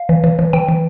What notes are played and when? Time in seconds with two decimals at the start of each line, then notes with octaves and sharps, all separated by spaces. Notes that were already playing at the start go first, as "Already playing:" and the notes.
Already playing: F5
0.09 E3
0.24 E3
0.39 E3
0.53 E3 G5
0.68 E3